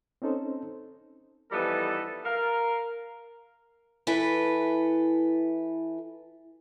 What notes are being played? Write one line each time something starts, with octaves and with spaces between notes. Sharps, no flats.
C4 C#4 D#4 A4 C5
E3 F3 G3 B3 D#4 A4
A#4 F5
E3 E4 A4 B4